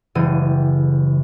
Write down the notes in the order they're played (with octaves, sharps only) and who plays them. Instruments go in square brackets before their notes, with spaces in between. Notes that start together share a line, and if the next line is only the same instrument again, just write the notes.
[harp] F#1 C#3 E3 G3 G#3 D#7